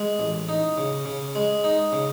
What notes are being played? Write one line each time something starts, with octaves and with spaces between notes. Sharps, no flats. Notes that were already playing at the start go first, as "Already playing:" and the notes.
Already playing: G#3
A1
D#4
C#3
C#3
G#3
D#4
C#3